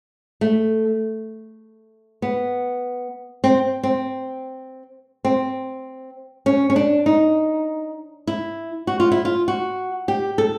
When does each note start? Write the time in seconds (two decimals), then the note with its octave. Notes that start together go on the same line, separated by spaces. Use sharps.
0.41 A3
2.22 B3
3.44 C4
3.83 C4
5.25 C4
6.46 C#4
6.70 C#4
6.76 D4
7.06 D#4
8.27 E4
8.87 F#4
9.00 F4
9.12 E4
9.25 F4
9.48 F#4
10.08 G4
10.38 A4